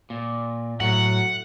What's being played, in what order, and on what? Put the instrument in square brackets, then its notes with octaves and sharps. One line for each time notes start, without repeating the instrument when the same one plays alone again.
[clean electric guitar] A#2
[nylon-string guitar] A2 [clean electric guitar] F#3 [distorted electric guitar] F#5